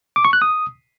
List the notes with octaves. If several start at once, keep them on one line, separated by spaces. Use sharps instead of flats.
D6
C#6
F#6
D#6